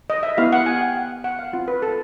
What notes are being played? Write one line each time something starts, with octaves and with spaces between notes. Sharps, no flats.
D#5
E5
B3 E4 G4 F5
F#5
G#5
G5
F#5
F#5
F5
C4 F4
B4
A4